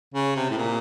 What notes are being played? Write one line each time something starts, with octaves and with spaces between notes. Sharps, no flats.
C#3
C3
A2
A#2